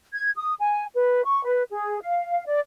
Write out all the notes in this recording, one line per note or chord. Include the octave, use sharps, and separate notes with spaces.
G#6
D#6
G#5
B4
C#6
B4
G#4
F5
D5